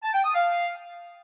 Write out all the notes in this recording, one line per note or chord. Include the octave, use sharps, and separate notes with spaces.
A5
G5
D#6
F5